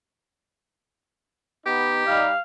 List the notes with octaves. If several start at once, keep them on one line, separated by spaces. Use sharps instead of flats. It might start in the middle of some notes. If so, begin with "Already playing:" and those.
B3 D#4 G4
G3 D#4 F5